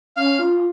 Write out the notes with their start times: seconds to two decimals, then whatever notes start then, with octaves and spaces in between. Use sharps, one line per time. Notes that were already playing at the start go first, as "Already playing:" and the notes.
0.16 C#4 F5
0.39 F4
0.56 F4